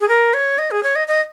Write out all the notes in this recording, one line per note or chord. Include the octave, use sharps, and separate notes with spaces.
G#4
A#4
C#5
D#5
G#4
C#5
D#5
D#5